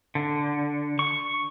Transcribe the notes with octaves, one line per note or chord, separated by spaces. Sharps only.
D3
C#6